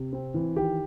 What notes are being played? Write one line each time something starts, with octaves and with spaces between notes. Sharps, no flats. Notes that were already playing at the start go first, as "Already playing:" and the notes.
Already playing: C3
C4
E3
D#3 G4